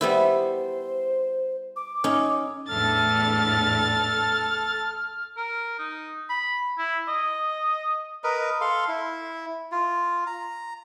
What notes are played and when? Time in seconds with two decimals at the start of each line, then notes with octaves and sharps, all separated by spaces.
0.01 G3 B3 E4 C5
1.76 D6
2.04 C#4 D#4
2.68 E2 A2 D4 A4 F6 A6
5.37 A#4
5.79 D#4
6.29 B5
6.78 E4
7.08 D#5
8.24 A#4 B4 D#5
8.61 A4 F5 C6
8.88 E4
9.72 F4
10.27 A#5